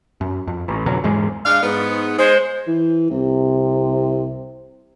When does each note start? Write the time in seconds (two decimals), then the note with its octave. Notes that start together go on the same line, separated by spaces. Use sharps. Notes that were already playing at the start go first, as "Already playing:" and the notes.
0.21 F#2
0.47 F2
0.68 A1
0.86 F2 B2 D3 F#3
1.04 E2 G#2 G#3
1.46 G#3 D4 F5
1.63 G#2 B3
2.18 G#3 C5
2.67 E3
3.10 C2 C3